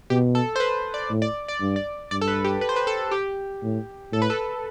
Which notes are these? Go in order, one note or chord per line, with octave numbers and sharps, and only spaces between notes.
B2 G4
A4
C5
B4
D5
A2
D5
D5
G2
D5
G2 D5
A4
B4
G4
B4
C5
B4
A4
G4
A2
A2 A4
B4
A4